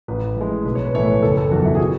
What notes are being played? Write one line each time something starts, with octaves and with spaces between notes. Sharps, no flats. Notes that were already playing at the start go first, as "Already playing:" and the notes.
A1 B4
A2 G#3
B1 B4
C#5
B4
A2 E3 A3 C#5
B4
F#1 A4
A4
E2 D#3 F#3 F#4
E4
G#4
F#4